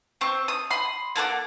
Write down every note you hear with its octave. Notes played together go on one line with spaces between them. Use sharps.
C4 C5 C#6
D#6
B5 C6 D#6
A#3 A4 F#5 D6